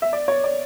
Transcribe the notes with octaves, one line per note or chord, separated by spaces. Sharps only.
E5
D5
C#5
D5